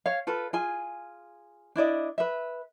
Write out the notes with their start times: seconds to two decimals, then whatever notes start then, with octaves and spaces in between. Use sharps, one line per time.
0.06 C#5 F5
0.27 F4 A4 B4
0.53 F4 G#4 G#5
1.76 D4 E4 D5 D#5
2.18 B4 E5